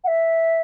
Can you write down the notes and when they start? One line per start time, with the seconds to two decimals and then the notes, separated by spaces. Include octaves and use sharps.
0.04 F#5
0.08 E5